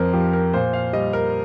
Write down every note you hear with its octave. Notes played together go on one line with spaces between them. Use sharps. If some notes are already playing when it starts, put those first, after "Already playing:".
Already playing: F2 A#4 C5
F3 G4
A#4
A#2 C5
F5
G3 D#5
A#4